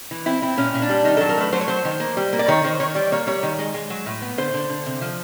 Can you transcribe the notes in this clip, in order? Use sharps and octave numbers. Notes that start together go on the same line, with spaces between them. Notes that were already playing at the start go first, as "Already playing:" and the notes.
E3
C4 E4
C4 E4
A#2 C#4
A#2
D4
G3
D#3 D#4
F#3 A4
A#4
A3 B4
F#3 C5
C#5
F#3 C5
D#3
A#3
G3
A#3
D5
D#3 C#5
D#3 C5
D#3 C#5
G3 D5
A#3 C#5
G3 C#5
D#3
G#3
G#3
F#3
A2
B3
D3 C5
D3
D3
C3
F3